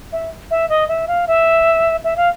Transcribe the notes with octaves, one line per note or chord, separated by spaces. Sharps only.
E5
E5
D#5
E5
F5
E5
E5
F5